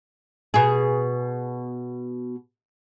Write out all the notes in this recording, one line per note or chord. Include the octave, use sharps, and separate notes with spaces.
B2 G#4